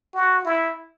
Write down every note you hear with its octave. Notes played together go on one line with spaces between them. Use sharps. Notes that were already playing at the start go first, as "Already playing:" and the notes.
F#4
E4